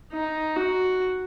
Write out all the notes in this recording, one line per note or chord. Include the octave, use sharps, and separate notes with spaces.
D#4
F#4